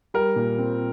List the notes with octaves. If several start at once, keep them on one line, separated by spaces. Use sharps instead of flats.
G3 A#4
A#2
C4